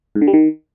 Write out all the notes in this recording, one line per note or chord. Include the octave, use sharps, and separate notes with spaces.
G#2
D3
G3
D#3